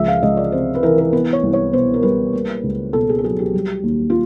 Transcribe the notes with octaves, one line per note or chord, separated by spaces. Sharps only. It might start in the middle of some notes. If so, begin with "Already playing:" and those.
Already playing: C#2 F3 E5
F5
C#2 D#5
D5
C3 C5
B4
E3 A#4
A#4
B3 B4
C#5
C2
C#5
B2 C5
A#4
G3 B4
A#3
C#2
B2 A4
G#4
A4
F#3 G#4
G4
G3
D#2
F4